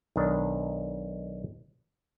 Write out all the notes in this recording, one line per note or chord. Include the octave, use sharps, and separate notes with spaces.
B1 D#3 D4